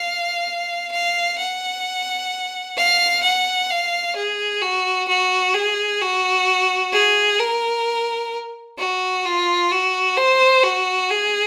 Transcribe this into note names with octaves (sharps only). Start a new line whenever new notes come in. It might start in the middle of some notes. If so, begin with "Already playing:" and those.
Already playing: F5
F5
F#5
F5
F#5
F5
G#4
F#4
F#4
G#4
F#4
G#4
A#4
F#4
F4
F#4
C5
F#4
G#4